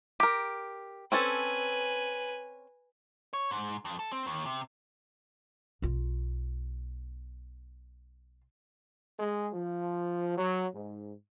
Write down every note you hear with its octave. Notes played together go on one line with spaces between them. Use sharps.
G4 A#4
C4 C#4 A4 B4 G#5
C#5
G#2
F2
A4
C4
D#2
C3
B1 F4
G#3
F3
F#3
G#2